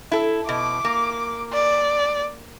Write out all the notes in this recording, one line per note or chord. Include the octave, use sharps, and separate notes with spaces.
E4 A4
B2 D6
A#3
D5